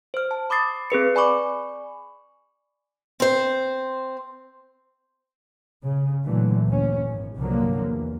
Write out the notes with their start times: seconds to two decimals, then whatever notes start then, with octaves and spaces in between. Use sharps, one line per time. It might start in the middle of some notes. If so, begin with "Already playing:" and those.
0.14 C5 F6
0.31 A5
0.50 B5 D6 D#6 A6 C7
0.90 C4 G#4 B4 C#7
1.15 D5 G#5 B5 C#6 D6
3.20 C4 C5
5.84 C#3
6.25 A#2 D3 E3 F#3 A3
6.68 G1 D2 A#2 C#4
7.04 G#1 A2
7.36 C2 G2 D3 F3 F#3 A#3
7.77 E2